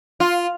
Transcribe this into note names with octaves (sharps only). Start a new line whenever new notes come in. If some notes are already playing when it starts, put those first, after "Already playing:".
F4